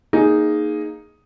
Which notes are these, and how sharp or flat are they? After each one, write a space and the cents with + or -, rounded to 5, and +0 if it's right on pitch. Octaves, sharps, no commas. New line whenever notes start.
A#3 +0 D#4 +0 G#4 +5